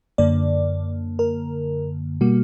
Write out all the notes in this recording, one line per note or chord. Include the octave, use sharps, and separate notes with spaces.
F#2 D3 A#3 D5
A#4
B2 G3 A#3 F#4